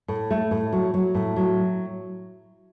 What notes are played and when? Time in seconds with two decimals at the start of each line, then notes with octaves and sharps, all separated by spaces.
0.08 A2
0.31 A3
0.51 A2
0.72 F#3
0.94 F#3
1.15 A2
1.36 F#3